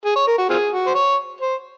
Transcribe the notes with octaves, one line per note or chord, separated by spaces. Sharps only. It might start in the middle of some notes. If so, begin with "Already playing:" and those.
G#4
C#5
A#4
F#4
C4 F4 G#4
F#4
C5
C#5
C5